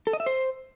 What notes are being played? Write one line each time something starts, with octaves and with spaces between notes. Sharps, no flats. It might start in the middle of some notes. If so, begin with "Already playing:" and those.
A4
D#5
E5
C5